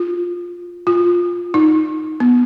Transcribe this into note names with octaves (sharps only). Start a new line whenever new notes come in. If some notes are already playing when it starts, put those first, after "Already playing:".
Already playing: F4
F4
D#4
B3